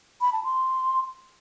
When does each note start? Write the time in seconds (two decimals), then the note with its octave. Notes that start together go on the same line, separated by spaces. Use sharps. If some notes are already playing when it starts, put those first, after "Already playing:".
0.21 B5
0.33 A5
0.44 C6